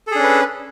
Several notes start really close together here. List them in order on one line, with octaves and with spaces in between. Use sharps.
A4 G#4 D4 C#4 B4